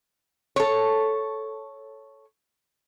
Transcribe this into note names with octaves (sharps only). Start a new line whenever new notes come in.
A4 C#5